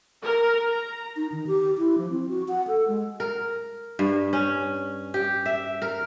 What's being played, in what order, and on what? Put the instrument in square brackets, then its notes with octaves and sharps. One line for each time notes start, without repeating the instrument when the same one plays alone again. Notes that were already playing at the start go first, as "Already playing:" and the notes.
[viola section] A#4
A#5
[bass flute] D#4
D#3
G4
E4
F3
C4
F#4
F#5
A4
G#3
[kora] A#4
G2
C#4
G4
E5
A#4